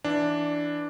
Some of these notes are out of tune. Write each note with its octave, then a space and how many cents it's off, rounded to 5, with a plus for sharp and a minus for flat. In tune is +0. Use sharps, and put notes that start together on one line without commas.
E3 +0 D4 +0